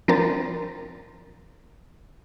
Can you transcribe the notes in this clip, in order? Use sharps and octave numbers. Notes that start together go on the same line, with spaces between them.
F3 C4 D4 A#4 C5 A6